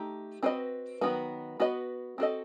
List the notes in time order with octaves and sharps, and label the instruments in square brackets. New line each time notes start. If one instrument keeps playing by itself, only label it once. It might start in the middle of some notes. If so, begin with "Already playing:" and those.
Already playing: [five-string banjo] A3 D#4 G4
C4 F#4 B4 D#5
D#3 F#3 B3 F#4
B3 F#4 B4 D#5
C4 F#4 A4 D#5